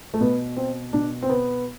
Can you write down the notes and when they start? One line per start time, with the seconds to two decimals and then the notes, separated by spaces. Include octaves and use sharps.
0.14 A3
0.21 B2 B3
0.57 C4
0.93 B2 D4
1.23 C4
1.29 B3